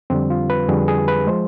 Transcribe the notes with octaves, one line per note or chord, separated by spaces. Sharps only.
F2 D3 G3 C4
F4
B4
F2 D3 G3 G#4
G#4
B4
F3 G#3 C5